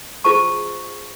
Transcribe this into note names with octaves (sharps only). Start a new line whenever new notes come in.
F4 G#4 C5 A5 C#6